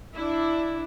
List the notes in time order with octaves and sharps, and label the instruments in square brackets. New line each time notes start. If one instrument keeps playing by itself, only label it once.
[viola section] D4 E4